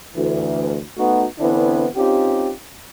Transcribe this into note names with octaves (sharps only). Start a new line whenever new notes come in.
D2 E3
A3 B3 D#4 F#4
D3 E3 B3 C4 D4 E4
C4 C#4 D#4 F4 G4